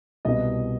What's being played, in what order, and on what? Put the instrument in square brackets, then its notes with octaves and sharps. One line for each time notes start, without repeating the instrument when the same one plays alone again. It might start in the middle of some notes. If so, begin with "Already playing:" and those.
[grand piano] C2 B2 G3 B3 E4 D#5